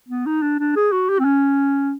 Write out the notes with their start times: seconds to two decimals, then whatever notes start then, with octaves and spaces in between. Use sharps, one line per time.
0.09 B3
0.26 D#4
0.42 D4
0.59 D4
0.76 G#4
0.92 F#4
1.09 G4
1.19 C4
1.25 C#4